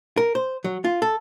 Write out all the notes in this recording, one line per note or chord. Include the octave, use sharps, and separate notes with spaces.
A#4
C5
F#3
F4
A4